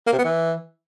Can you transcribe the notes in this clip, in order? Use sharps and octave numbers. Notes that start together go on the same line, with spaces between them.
A#3
C3
B3
E3